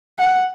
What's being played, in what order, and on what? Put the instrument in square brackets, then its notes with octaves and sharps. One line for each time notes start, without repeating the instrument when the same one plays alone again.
[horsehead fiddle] F#5